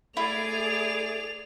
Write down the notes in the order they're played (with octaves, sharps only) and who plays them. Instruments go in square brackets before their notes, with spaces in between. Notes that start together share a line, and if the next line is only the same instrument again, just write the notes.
[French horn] A3 [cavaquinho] E4 [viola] G#4 D5 [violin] F7